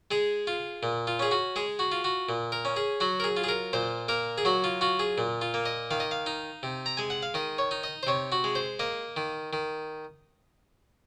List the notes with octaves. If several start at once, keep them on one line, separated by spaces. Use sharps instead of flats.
G#3 G#4
F4
A#2
F4
C#4 G#4
F#4
G#3 G#4
F#4
F4
F#4
A#2
A#4
C#4
G#4
F#3 F#4
A#4
G#4
F4
G#4
A#4
A#2 C5
A#3 A#4
G#4
F#3 F#4
F4
F4 F#4
G#4
A#2
F4
A#3
D#5
D#3 F5
D#5
F5
D#4
C3
A#5
G#3 G#5
F#5
F5
D#3 D#5
C#5
D#4
D#5
C5
C3 C#5
F#4
G#3
C5
A#3 D#5
D#3
D#3